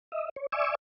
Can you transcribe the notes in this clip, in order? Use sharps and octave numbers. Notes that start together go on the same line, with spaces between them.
D#5 E5
C#5
D5 E5 G#5 C#6 D6 E6